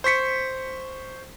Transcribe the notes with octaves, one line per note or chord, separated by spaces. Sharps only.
C5 C#6 B6 C#7